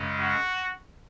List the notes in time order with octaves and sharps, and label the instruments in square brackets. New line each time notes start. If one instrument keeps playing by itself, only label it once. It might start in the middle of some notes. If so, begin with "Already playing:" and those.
Already playing: [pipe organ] F#2 C#3 G#3 C#4
[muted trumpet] F#4